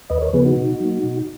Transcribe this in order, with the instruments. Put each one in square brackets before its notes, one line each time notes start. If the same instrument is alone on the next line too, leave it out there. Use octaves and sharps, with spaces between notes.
[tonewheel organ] D#2 B4 D#5
A#4 C#5
C#3 F3 B3 G#4 B4
D#4 F#4
B2
F#3 A#3
B2